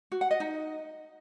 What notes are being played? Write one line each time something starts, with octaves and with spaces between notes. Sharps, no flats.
F#4
F#5
D#5
D#4